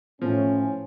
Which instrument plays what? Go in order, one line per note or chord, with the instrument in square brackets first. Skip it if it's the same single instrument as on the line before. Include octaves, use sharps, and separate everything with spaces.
[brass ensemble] A2 C#4 [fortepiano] F3